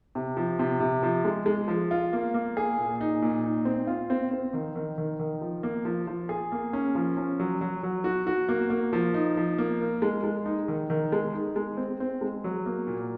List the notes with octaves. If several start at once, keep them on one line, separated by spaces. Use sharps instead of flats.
C3
F3
C3
C3
F3
G#3
G#3
F3
F4
A#3
A#3
G#4
A#2
D#4
A#2
D#4
C4
F4
C4
C4
D#3
D#3
D#3
D#3
F3
A#3
F3
F3
G#4
A#3
C#4
F3
C#4
F#3
F#3
F#3
F#4
F#4
A#3
A#3
F3
D#4
F3
A#3
A#4
G#3
G#3
D#4
D#3
D#3
G#3
D#4
G#3
C4
C4
G#3
F#3
A#3
A#2